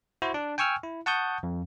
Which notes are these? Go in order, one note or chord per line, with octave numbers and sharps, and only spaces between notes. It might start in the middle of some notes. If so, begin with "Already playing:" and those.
E4 F#4 C5
D4
G5 G#5 C#6 E6 F6
E4
F#5 A5 C#6 D#6 G6
F2